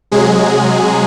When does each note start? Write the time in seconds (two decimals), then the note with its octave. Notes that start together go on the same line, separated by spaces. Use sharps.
0.12 C3 F#3 G#3 G#4